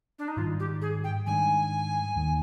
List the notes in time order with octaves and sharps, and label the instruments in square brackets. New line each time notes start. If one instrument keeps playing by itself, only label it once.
[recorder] D4
D#4
[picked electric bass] G#2 D#3 G3 [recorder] F4
[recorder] G4
G#4
G5
[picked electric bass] G#2 D#3 G3 D4 [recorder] G#5
[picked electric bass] D#2 D#3 A#3